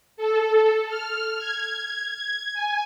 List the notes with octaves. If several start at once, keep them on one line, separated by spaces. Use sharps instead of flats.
A4
F6
G#6
G#5